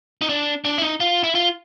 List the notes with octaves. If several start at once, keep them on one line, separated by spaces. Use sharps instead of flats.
D#4
D4
D4
E4
D#4
F4
E4
F4